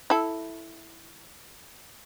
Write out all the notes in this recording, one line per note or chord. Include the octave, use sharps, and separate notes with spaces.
E4 A4